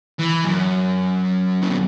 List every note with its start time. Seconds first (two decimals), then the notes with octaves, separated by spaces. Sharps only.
0.19 E3
0.45 F#2
1.63 C#3
1.70 B2